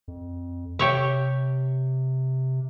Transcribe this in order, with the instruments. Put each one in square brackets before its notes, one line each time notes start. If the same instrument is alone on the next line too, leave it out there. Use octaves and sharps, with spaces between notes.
[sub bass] F2
[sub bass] C3 [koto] G4 C#5 E5